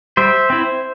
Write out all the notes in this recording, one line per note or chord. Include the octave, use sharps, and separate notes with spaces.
G3 C5 E5
C4 E4